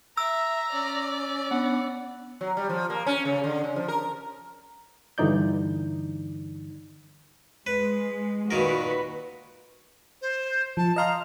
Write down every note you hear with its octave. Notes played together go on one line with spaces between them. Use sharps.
E5 A#5 E6
C#4 D5
B3 D4 F#5
F#3
G3
F3
A#3
C#4
C#3
D3
C#3
F3
A#4
G2 D3 E3 D#4 D5 G6
G#3 B4
A#2 D#3 F#4 A#4 B4
C5
F3 A5
D#5 F5 A#5 C6